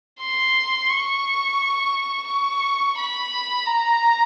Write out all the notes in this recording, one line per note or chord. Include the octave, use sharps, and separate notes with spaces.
C6
C#6
C#6
B5
A#5